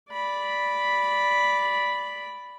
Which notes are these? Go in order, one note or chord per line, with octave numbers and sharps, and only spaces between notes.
D5 B5